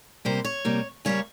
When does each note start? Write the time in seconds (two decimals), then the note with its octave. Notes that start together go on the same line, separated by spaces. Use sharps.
0.25 C3 G3 A#3 C5
0.45 C#5
0.65 C3 G3 A#3
1.05 C#3 G3 A#3 C#5